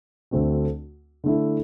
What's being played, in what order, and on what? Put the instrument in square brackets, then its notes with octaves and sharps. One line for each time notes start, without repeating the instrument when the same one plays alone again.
[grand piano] D2 D3 A3 C4 F#4
D3 A3 E4